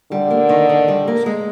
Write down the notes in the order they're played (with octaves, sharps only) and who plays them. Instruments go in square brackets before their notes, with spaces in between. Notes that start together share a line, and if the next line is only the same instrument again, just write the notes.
[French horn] D3 [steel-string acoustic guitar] G3
[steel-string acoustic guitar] A#3
D#3
D#3
G3
A#3
G#3